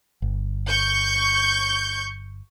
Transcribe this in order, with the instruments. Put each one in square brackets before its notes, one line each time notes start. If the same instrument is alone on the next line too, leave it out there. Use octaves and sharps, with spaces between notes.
[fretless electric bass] G1
[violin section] C#6 G6